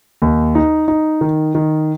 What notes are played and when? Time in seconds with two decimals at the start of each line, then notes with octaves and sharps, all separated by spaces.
0.22 D#2
0.55 D#4
0.88 D#4
1.21 D#3
1.55 D#3